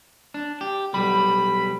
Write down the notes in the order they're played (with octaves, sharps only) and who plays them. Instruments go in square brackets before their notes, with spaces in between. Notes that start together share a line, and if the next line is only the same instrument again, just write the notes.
[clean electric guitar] D4
G4
[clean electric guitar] B1 G3 [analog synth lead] B5